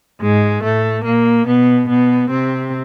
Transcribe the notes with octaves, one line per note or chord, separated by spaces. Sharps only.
G#2 G#3
A2 A3
A#2 A#3
B2 B3
B2 B3
C3 C4